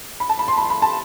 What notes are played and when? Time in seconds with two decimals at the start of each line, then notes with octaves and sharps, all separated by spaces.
0.20 B5
0.29 A5
0.39 B5
0.48 C6
0.58 B5
0.70 B5
0.82 A5